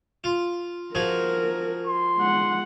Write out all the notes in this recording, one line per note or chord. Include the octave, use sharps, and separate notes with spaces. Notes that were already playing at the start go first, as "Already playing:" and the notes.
F4
F3 F#4 G#4 A#4
C6
G#3 F#5